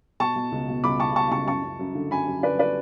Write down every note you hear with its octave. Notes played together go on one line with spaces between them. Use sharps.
B2 A5 C#6
B2
C#2
B2
C#2 B5 D6
B2 A5 C#6
B2 A5 C#6
C#2 A5 C#6
F#2 A5 C#6
F#2
F#2
D3
F#2 G#5 B5
F#2
D3 B4 D5
B4 D5